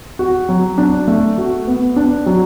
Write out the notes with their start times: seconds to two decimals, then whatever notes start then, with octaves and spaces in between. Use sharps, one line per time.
0.19 F#4
0.49 F#3
0.78 D4
1.07 A3
1.38 F#4
1.67 B3
1.96 D4
2.26 F#3